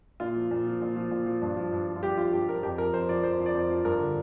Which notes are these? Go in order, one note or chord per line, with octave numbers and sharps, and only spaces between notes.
A#2 F4
F3
A#2
F3
A#2
F3
A#2
F3
G2
F3
G2
F3
F4
G2 G4
F3 F4
G2 G4
F3 A#4
F2 G4
F3 A#4
F2 C5
F3 D5
F2 C5
F3
D5
F2 C5
F3
G2 A#4
D3